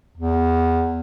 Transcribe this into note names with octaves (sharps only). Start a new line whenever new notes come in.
E2